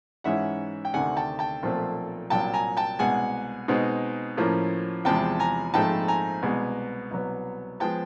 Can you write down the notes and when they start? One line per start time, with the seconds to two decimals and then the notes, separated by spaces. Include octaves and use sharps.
0.24 G#2 E3 G#3 C#4 E4 E5 F#5
0.85 G5
0.94 D2 C3 D#3 F#5 G#5
1.17 G5 A5
1.39 G5 A5
1.63 B1 A#2 F3 A3 C4
2.30 C2 A#2 F#3 G5 A5
2.53 G#5 A#5
2.77 G5 A5
2.99 C2 B2 G#3 F#5 G#5
3.68 B2 G#3 C4 D#4
4.37 A2 F3 A#3 C#4
5.05 E2 C3 F3 G#3 G5 A5
5.40 G#5 A#5
5.74 A#1 G#2 F3 A3 C4 G5 A5
6.08 G#5 A#5
6.43 C2 B2 G#3 B3
7.11 C2 B2 F#3 B3
7.80 F3 G#3 B3 G5 A5